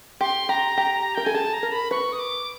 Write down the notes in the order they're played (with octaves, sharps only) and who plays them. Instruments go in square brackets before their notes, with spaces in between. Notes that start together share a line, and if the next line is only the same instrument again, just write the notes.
[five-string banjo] G4 [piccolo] C6
[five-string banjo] G4 [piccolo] A#5
[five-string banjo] G4
[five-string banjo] A#4 [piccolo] G5
[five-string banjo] A4 [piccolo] G#5
[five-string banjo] G#4 [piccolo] A5
[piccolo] A#5
[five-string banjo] A#4
[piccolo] B5
[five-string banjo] B4 [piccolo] C#6
[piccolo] D#6
D6